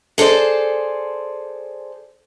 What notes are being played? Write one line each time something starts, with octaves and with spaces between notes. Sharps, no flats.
G#4 A4 C5 D5